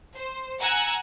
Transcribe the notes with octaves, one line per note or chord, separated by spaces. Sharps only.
C5
F#5 G#5 A#5 E6 F#6 G#6